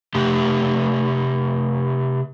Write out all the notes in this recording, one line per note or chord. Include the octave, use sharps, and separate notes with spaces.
C3 A3 G4